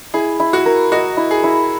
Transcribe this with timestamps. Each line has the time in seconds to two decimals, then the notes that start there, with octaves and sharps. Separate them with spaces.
0.14 E4 G#4
0.40 E4
0.53 F#4
0.66 A#4
0.92 F#4 D#5
1.17 E4
1.31 G#4
1.44 E4